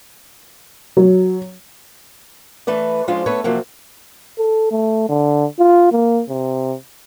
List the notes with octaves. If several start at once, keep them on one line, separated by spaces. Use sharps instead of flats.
F#3
E3 A3 B4 D5
F3 G#3 C#4 D4 F4 C5
A3 B3 A4 B4 C#5
C3 F3 F#3 A#3
A4
A3
D3
F4
A#3
C3